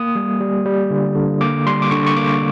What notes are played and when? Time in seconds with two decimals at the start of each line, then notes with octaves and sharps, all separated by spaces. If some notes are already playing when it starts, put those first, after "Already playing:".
Already playing: A#3 D#6
0.15 G3
0.41 G3
0.66 G3
0.91 D3
1.15 D3
1.41 A#3 D6
1.66 G3 C6
1.82 D6
1.91 D3 C#6
2.07 C#6
2.16 A#3 D6